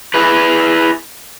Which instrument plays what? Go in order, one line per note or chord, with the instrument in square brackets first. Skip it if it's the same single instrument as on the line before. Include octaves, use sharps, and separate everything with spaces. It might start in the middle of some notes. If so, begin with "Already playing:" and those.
[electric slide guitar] E4 G#4 B4